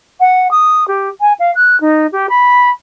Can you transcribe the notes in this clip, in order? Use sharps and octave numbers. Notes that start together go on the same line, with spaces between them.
F#5
D#6
G4
G#5
F5
F#6
D#4
G4
B5